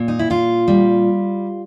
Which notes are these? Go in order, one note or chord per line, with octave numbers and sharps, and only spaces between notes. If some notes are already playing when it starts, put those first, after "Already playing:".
Already playing: A#2
D#4
E4
A#2 F4
G3